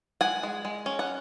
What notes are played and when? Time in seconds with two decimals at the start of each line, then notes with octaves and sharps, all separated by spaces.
0.21 G#3 F#5 G#5
0.43 G#3
0.65 G#3
0.86 C#4
0.99 F#5